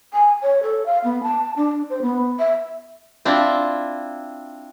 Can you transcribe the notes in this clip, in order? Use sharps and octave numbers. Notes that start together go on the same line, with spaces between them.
G#5
C#5
A4
F5
B3
A5
D4
C5
B3
E5
C4 D4 E4 F4